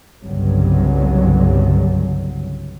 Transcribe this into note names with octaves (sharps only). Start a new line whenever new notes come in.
G1 C2 G2 C#3 F#3